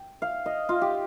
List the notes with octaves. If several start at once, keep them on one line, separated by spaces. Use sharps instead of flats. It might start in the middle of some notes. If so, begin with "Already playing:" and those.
Already playing: G5
F5
D#5
F4
G4